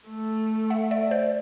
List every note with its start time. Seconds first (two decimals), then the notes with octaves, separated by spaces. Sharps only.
0.08 A3
0.70 E5 F#5
0.91 D5 E5
1.11 C5 D5